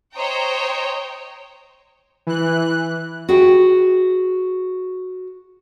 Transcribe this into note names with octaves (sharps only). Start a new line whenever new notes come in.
C5 C#5 D#5 G5 A#5
E3 F#6
F#4 G#4 B4 E5 G5